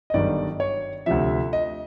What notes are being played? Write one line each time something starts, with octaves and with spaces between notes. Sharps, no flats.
D#5
G1 G2 D#3 F#3 D5
C#5
D2 C3 F3 E5
D#5